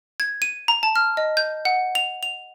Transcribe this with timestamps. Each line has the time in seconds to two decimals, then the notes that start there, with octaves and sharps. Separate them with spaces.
0.20 G#6
0.42 D#7
0.68 A#5
0.83 A5
0.96 F6
1.17 D#5
1.37 G6
1.65 F#5
1.95 F7
2.23 F7